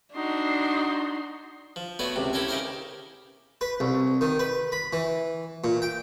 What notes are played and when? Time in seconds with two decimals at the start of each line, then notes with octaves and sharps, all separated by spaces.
0.15 D4 D#4 F#4 C6
1.76 F3
1.99 A3 B3 F#4 B4 C#5 D5
2.16 C#2 C3
2.33 E4 G4 A4 A#4 C#5
2.48 C#3 D#4 G4 A#4 C5 D6
3.61 B4
3.80 C2
4.21 D#3
4.39 B4
4.72 B5
4.93 E3
5.64 A#2
5.82 G5